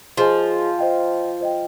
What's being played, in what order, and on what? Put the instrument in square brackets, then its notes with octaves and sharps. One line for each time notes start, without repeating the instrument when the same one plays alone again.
[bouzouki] F3 [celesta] F4 G#4 C5 D#5 G#5
[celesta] C5 D#5 G5
C5 D#5 G5